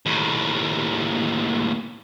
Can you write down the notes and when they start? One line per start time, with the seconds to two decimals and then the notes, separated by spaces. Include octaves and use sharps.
0.06 D#2 A2